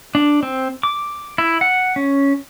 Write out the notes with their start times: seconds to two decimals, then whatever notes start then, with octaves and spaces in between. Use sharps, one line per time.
0.15 D4
0.43 C4
0.83 D6
1.38 E4
1.61 F#5
1.96 C#4